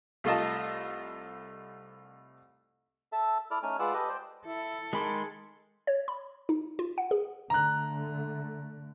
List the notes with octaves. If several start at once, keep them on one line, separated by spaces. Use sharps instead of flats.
C2 A3 F4 D#5 A5
A4 E5 A5
E4 A4 D5 F6
A3 C#4 D#4 G#5 F6
G#3 F4 B4 D5 F#5 E6
G4 A4 B4 D#5
C5 D5 G5
E4 A4
D#3 G#3 G#4 B5 C6 D6
C#5
B5
D#4
F4
F#5
G#4
D3 A3 A#5 F#6